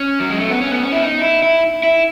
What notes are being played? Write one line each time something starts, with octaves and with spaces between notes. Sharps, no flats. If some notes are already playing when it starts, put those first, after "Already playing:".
Already playing: C#4
F#3
G#3
A3
B3
C#4
B3
C#4
E4
D#4
E4
E4
E4